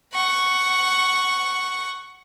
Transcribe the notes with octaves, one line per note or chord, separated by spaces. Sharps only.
F#5 C#6